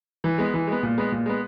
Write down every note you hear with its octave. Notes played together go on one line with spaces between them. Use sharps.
E3
G#3 B3
E3
G#3 B3
A#2
G#3 B3
A#2
G#3 B3